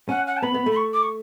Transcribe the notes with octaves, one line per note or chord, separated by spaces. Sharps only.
C#4 F#5
F#5
A5
B3 B5
B3
A3
B5
C#6
D6
C#6